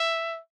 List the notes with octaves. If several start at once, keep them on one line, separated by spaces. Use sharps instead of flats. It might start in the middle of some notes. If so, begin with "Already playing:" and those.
Already playing: E5